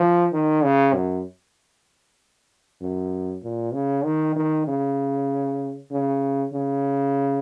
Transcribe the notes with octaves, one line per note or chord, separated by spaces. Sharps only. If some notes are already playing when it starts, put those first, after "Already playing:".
Already playing: F3
D#3
C#3
F#2
F#2
A#2
C#3
D#3
D#3
C#3
C#3
C#3